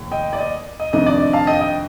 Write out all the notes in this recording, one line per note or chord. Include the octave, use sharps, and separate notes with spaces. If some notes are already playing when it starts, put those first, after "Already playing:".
Already playing: F1 D#2
D#5 G5
D5
D#5
D#5
F2 C3 D#3 A3 D4 D#5
D5
D#5
F5 A5
D#5 G5
D#5 G5